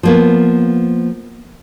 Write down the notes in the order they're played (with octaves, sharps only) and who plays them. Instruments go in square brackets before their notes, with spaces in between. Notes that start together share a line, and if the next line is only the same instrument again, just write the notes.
[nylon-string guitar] F3 A#3 B3